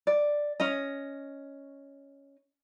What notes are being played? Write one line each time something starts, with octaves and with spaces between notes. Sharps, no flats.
D5
C#4 D#5